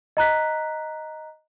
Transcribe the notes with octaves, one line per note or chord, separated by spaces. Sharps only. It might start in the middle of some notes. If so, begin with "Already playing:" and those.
D#5 A#5 F#6 B6